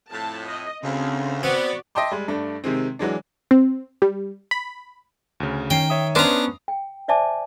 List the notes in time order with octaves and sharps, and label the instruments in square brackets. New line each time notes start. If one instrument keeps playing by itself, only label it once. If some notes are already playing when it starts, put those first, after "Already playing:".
[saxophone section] F2 A2 [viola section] A5
[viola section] D#5
[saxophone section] D2 [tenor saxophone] C#3 [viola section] C4
[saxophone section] B3 [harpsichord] C4 [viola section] F#4 D5
[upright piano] D#5 E5 G5 A5 C6 D6
G3 G#3
G2 A3 D4
C3 D#3 G#3 C4
E3 F#3 G#3 D4
[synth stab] C4
G3
B5
[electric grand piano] D2 C#3
[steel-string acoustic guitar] D#3 [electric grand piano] C#4 C7 [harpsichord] G5
[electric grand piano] C#5 E5 D#6
[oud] B3 C#4 C5 [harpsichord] D4 A#5
[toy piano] G5
C5 D5 E5 G#5 A5 D6